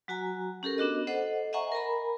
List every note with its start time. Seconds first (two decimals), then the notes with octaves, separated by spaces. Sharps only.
0.08 F#3 F#4 G#5 A#5
0.63 C#4 G4 A4 A#4
0.78 B3 D4 F#4 D#5
1.07 A4 C5 D#5 F#5
1.53 D#5 E5 F#5 G#5 A#5 C#6
1.72 A#4 G#5 A#5 B5